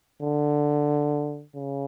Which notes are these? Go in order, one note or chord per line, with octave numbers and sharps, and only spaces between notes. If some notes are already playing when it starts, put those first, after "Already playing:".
D3
C#3